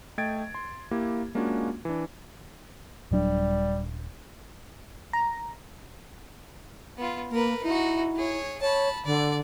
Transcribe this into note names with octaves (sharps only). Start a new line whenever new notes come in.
A3 D#5 G5 G#6 A6 D7
C6
A#3 E4 G4
G#3 A#3 C#4 D4 F4 F#4
E3 D4
D#1 F#3 G3 D4
A#5
B3 F4
A#3 A#4 B4
D#4 E4 F#4
G#4 C#5
C#5 A5 B5
D3 D5